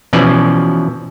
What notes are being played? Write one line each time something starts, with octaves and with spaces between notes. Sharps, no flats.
B2 E3 F3 C#4 D5